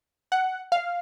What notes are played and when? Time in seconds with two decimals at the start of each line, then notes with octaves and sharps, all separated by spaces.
0.32 F#5
0.72 F5